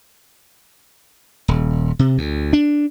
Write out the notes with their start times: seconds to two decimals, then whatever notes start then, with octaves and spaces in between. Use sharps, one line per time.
1.48 D#1
1.99 C3
2.18 D2
2.53 D4